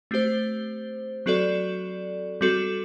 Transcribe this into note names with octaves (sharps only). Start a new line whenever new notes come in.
A3 C4 G4 C5
F#3 C4 F#4 A4 D5
G3 C4 F#4 A4